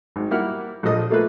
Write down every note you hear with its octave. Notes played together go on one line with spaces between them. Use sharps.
G#1
G3 A#3 E4 F#5 F6
A#1 F3 A4 D#5 D#6
A3 A#3 F4 A4 B4